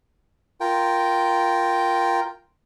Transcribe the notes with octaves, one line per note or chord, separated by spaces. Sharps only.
F4 A#4 G5